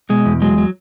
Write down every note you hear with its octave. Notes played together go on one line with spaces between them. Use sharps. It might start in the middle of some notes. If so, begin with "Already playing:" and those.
B2 G#3
E2
F#3 G#3
F#3